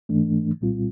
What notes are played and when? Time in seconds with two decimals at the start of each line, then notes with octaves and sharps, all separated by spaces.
0.09 G#2 E3 A3 D4
0.61 C2 A#2 G3 C4 F4